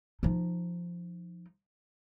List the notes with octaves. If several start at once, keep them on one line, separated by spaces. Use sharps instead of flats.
F3 D#4